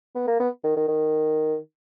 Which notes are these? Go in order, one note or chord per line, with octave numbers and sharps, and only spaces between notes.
B3
A#3
B3
D#3
D#3
D#3